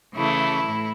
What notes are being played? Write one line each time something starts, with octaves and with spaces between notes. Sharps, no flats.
C#3 E3 A3 E4
A2